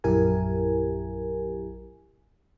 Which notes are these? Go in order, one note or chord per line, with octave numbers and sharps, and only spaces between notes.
A#1 F#2 E4 G4 A#4 G#5